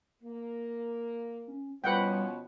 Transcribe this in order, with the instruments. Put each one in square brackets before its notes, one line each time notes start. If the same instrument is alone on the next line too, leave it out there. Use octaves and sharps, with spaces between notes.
[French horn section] A#3
[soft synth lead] C#4
[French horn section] B2 F3 C#4 [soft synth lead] G3 [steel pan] B4 F#5 G5